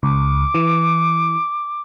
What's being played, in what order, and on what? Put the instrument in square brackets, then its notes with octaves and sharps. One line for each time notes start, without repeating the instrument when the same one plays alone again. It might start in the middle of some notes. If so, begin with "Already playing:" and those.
[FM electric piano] C#2 [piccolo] D6
[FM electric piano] E3